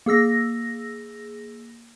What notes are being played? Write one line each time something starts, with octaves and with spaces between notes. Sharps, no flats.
A#3 G#4 E6 A#6